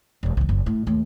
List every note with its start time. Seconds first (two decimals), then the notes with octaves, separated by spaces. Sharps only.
0.23 E1 F4
0.37 C2 E3
0.49 F#1
0.66 A2
0.87 D#2 A3